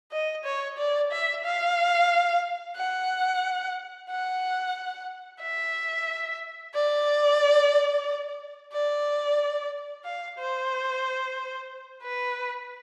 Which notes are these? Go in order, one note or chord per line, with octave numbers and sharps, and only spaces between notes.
D#5
C#5
D5
E5
F5
F#5
F#5
E5
D5
D5
F5
C5
B4